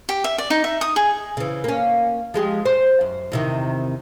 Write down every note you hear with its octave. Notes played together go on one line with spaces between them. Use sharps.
G4
E5
D5
D#4
E5
D#6
G#4
C#3 E3
A#3 C#4
F3 G#3 G4
C5
F#2
E2 C3 D#3